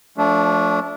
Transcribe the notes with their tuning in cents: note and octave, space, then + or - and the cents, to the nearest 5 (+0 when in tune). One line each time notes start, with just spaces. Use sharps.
F3 +20 A3 +0 D4 -25